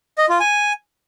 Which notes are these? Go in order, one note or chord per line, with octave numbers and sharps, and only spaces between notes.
D#5
F4
G#5